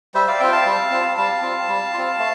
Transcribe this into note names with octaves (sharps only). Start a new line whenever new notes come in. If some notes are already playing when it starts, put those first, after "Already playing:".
G3 C5 E5
D5 F5
C4 F4 E5 G5
F5 A5
G3
C4 F4
G3 F5 A5
C4 F4
G3
C4 F4
A3